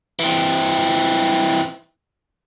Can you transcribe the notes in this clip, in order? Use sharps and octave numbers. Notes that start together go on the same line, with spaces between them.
E3 C4